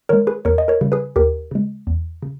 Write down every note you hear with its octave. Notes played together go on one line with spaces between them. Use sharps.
D#3 G#3 A#4 C#5
G#4 B4
E2 A#4 C#5
D#5
A#4 C#5
C#3 G3
G#4 B4
D#2 G4 A#4
C#3 G#3
E2
C#3